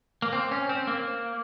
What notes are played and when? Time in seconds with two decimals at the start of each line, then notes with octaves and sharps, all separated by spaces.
0.22 A#3
0.33 C4
0.51 C#4
0.69 C4
0.87 A#3